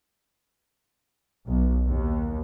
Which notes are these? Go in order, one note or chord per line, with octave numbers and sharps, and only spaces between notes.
B1
D#2